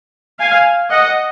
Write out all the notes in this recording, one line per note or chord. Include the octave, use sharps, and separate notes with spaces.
F5 G#5
D#5 F#5